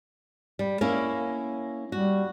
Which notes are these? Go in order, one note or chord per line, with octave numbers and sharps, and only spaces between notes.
G3
A#3 C#4 E4
G3 F#4